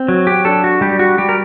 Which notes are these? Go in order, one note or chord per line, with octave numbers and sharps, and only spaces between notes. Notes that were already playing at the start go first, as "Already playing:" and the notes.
Already playing: C4
F#3
G4
D4 A4
F#4
G3 G4
F#4
G3 G4
A#4